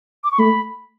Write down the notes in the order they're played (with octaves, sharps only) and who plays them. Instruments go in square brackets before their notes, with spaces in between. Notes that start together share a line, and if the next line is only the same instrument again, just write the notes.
[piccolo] D6
C#6
[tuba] A3 [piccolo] B5